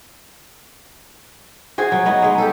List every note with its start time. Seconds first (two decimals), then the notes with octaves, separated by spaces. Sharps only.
1.78 F#4 G#4 C5
1.92 F#3
2.06 B3 D#4 F#4
2.22 G#3 D#4
2.38 G4 A4